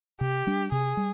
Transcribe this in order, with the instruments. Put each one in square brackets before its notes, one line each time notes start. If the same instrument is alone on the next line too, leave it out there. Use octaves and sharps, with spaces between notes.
[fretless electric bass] C3 [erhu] G4
[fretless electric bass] G3 D4
[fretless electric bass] C3 [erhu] G#4
[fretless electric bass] G3